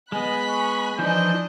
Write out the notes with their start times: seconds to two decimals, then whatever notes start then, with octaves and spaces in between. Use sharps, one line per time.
0.12 G#3 B3 D#5 G#5 B5 F#6
0.49 C#6
0.99 E3 F3 D4 D#4 D#5 G6